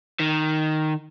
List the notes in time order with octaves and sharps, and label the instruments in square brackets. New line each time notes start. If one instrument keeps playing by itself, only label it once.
[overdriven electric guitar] D#3